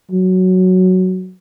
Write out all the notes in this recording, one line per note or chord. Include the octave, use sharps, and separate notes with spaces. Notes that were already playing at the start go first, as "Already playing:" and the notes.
F#3